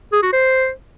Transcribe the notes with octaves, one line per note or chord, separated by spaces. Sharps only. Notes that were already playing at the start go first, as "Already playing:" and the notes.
G#4
F#4
C5